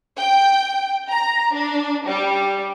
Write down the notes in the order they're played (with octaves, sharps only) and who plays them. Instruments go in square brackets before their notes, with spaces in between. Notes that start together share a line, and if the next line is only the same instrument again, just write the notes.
[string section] G5
A#5
D4
G3